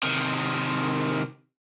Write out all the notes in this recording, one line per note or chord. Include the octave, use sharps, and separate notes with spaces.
C3 D#3